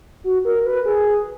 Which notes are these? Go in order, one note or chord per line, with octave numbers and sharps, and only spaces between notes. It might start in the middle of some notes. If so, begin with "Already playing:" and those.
F#4
A#4
B4
G#4